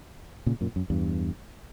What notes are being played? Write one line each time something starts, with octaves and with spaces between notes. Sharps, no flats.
A#2 C#3
F#2 A#2
F#2
E2 G2